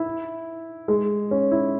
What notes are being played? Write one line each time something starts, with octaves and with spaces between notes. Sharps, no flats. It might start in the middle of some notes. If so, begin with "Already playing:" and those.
Already playing: E4
G#3
C#4
E4